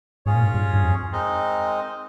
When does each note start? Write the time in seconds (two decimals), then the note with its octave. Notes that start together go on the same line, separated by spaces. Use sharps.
0.26 G#2 C#4 F4 G#4 C#5
0.34 A#2
0.43 G#2
0.54 G2
0.74 G2
0.83 F2
1.12 G#3 C4 D#4 A#4 D#5